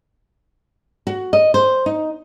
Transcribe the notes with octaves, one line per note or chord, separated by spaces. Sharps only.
F#4
D#5
C5
D#4